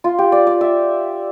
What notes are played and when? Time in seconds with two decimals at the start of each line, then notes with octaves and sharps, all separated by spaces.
0.04 F4
0.18 G4
0.32 D5
0.47 D5
0.61 E5